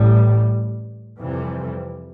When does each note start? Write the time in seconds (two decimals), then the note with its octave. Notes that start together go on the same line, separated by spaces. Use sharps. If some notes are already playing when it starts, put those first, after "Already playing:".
Already playing: A1 A2 G3
1.20 F2 C3 E3 G3